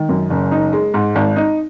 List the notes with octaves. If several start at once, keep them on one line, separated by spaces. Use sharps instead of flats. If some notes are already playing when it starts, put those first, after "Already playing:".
Already playing: D#3
F#2
F#1
D#4
G#3
G#2
G#1
D#4